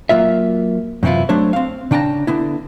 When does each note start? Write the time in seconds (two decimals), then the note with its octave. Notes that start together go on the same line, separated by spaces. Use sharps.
0.09 F#3 A#3 F4 E5
1.03 F#2 C3 E3 E4 F4
1.29 F#3 A3 D4 C5 C#5
1.53 C4 F5
1.91 C#3 D4 G5 A5 A#5
2.27 D3 B3 E4